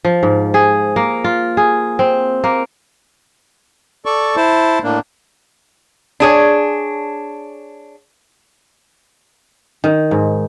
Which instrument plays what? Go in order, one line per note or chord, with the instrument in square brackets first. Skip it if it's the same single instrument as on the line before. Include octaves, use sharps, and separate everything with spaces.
[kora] F3
G#2
G#4
A#3
F4
G#4
C4
A#3
[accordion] A4 D5 C#6
E4 C5 A5
A2 A#3 D4
[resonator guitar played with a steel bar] D4 G#4 C#5
[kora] D#3
G#2